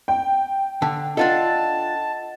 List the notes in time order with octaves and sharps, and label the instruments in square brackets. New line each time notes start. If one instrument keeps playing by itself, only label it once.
[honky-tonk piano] G5
[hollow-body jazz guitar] D3 [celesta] A5
[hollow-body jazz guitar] D4 F4 A4 [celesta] D#5 F#5 A6 [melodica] A5